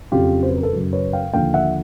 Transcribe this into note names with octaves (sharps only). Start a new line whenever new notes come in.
F2 C#3 F#3 F4 G4
C5
B4
A#4
A4 B4
F#2 C#3 F#3
B4 C#5
F5 G5
D#2 D3 F3 F5 G5
E5 F#5